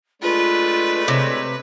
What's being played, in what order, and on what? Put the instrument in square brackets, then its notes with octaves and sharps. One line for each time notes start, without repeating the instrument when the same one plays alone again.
[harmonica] G#3 A3 D4 [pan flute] F4 [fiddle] B4
[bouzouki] C3 [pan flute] C#5